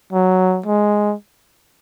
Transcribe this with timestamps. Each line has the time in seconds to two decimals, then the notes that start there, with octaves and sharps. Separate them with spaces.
0.13 F#3
0.66 G#3